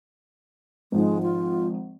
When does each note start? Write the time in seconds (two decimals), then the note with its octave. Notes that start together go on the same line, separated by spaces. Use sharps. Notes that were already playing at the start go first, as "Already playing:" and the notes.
0.92 G#1 F3 G#3 D#4
1.22 F4